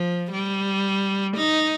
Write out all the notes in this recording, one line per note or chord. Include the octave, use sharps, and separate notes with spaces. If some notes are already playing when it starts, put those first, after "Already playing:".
Already playing: F3
G3
D#4